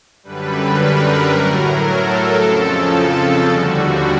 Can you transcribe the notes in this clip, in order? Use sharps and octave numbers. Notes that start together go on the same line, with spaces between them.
F#2 D3 G3 B4
A#4
A2 F#3
A4
F2 C#3 F3 A4
A4
D#2 D3 G3 F#4